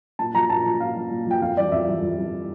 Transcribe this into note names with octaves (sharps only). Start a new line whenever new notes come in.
A#2 A5
F3 A#5
A#2 A5
F3
A#2 F5
F3
A#2
F3 G5
F2 F5
E3 G3 D5
F2 E5
E3 G3
F2
E3 G3